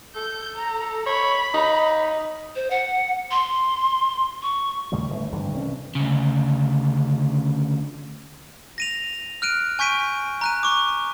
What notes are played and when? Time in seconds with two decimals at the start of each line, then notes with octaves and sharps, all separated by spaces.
0.16 A4 G6
0.56 A#5
1.06 C#5 B5
1.54 D#4
2.56 C5
2.70 F#5
3.31 C6
4.42 C#6
4.92 D#2 A2 C#3 G3
5.10 G1 A3
5.32 G#1 G2 D3 E3
5.53 C2 E3 F#3 C#4
5.95 D2 C#3
8.78 A#6 D#7 F7
9.42 F6 F#6 D7 D#7
9.79 G#5 C#6 G6 B6 D7 D#7
10.41 A#5 F#6 D#7
10.63 C#6 D6